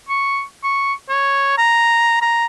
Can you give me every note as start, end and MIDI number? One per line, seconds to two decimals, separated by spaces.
0.09 0.43 85
0.64 0.93 85
1.09 1.56 73
1.58 2.18 82
2.22 2.46 82